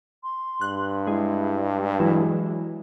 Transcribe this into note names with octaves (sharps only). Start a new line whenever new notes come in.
C6
G2 F#6
G#3 E4
E3 F#3 G#3